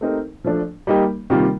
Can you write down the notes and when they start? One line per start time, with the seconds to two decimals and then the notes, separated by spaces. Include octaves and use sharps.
0.01 A3 C4 D#4 G4 A#4
0.44 F3 A3 D4
0.87 G3 A#3 D#4 G4
1.30 C3 D#3 G3 A#3 F4